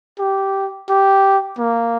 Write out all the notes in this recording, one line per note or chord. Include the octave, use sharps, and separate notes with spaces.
G4
G4
A#3